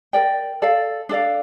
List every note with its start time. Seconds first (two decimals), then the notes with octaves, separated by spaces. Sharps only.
0.13 A#4 D5 G5
0.62 A4 D5 F5
1.09 D4 A4 D5 F5